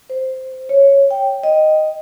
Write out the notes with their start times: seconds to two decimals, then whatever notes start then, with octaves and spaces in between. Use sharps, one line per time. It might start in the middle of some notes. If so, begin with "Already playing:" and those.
0.10 C5
0.69 C#5
1.11 G5
1.43 D#5